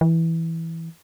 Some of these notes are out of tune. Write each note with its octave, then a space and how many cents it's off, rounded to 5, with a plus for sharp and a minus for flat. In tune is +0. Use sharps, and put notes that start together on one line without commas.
E3 -5